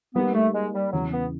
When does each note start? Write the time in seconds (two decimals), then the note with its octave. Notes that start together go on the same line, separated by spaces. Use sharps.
0.15 G3 A#3 B3 D#4 G4
0.34 A3
0.54 G#3
0.74 G3
0.92 E2 C#3 E3 F#3
1.12 B3